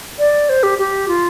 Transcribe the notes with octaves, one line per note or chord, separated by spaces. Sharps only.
D5
C5
G4
G4
F4